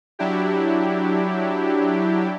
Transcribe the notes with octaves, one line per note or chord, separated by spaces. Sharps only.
F#3 D4 E4 G4